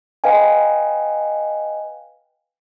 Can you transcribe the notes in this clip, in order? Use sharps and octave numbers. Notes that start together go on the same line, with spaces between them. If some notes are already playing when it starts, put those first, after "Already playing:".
B4 D#5 F5 G5 G#5